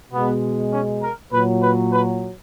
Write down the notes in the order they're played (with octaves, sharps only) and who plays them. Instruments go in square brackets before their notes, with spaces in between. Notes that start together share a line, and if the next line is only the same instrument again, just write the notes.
[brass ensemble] B2 G#3 B3
C#4
A#4
A#2 F#3 B4
B4
B4